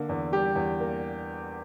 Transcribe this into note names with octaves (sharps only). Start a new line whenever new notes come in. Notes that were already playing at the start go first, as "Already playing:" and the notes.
Already playing: D3 A#3
E2
G3 G4
E2
A#3